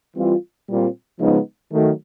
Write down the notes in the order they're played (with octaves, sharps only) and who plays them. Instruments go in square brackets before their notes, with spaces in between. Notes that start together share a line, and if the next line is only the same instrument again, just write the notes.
[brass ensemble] E3 G3 C4 F4
A#2 G3 C4 F4
C#3 F3 G#3 B3 D#4
D#3 F#3 A3